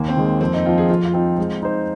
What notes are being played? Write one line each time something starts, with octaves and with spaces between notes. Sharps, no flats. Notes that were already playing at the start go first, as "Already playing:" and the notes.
Already playing: D#2 A#3
C4
D#3 G#3
A#3
F2 C4
D#4
F3 C4 F4
G#4
F2 F4
F4
F3 C4 D#4
G#3 C4
D#4 C5